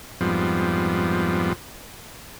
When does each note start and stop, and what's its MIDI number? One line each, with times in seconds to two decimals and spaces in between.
0.21 1.53 41
0.21 1.53 44
0.21 1.53 53
0.21 1.53 55
0.21 1.53 59